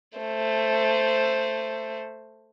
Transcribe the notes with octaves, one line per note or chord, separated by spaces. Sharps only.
A3 C5